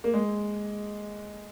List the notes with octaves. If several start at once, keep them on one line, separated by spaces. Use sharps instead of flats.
A#3
G#3